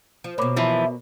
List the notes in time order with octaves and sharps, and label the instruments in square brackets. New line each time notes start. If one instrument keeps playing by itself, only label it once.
[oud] F3
[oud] B2 A#3 [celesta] C#5 B5 D6
[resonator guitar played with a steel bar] E3 F3 [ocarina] E5